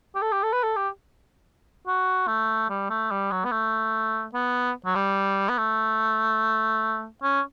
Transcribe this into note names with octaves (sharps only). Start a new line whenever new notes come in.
G4
A4
G4
A4
B4
A4
G4
F#4
A3
G3
A3
G3
F#3
B3
A3
B3
F#3
G3
B3
A3
C#4